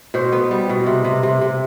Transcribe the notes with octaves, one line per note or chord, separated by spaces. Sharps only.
B2 C5
B3
G3
B2
C3
C3
C3
C3